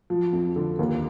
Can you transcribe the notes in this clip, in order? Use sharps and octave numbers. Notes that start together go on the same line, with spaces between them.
F3
F2
D3
D#2